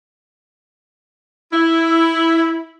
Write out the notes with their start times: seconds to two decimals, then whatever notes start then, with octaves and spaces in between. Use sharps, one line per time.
1.53 E4